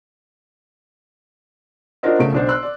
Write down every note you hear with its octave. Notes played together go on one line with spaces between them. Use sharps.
D4 F4 F#4 A#4 C5 D#5
C#3 A3 D7
B1 D4 C5
C6 E6 F#6
D5